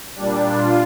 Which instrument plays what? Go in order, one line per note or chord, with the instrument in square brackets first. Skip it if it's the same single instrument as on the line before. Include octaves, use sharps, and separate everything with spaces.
[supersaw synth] A#2 G3 D4
F4